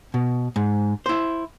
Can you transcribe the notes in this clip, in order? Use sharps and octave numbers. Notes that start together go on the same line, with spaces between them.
B2
G#2
E4 C5